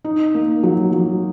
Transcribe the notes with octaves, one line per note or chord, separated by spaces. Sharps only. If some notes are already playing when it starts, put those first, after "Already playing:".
D#4
A#3
F#3
F#3